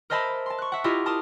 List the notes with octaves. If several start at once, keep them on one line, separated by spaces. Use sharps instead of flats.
A#4 C5 D#5 E5 A5 B5
A5 C6
C#6 F#6
E5 F#5
E4 F4 G4 D#5
A#4 A5 C6 D#6